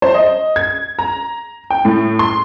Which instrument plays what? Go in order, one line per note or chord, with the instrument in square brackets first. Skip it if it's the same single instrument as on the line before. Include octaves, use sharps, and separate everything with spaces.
[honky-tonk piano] C5
D#5
G#6
A#5
G5
A2
C6